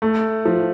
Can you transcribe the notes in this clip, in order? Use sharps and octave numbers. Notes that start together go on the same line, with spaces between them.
A3
F3